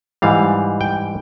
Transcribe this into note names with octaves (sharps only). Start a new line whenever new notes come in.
G#2 E3 G3 F5
G5